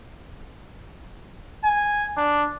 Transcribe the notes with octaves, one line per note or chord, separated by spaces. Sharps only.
G#5
D4